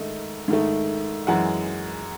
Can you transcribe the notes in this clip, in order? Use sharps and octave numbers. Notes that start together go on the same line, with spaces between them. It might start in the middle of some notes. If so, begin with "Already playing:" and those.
Already playing: G#2 D#3 A3 D#5
G#2 D#3 A3
F#2 E3 G#3 F#5